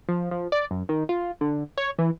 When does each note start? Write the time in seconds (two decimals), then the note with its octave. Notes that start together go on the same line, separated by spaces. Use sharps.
0.09 F3
0.31 F3
0.52 D5
0.71 F#2
0.89 D#3
1.09 F4
1.41 D3
1.78 C#5
1.99 E3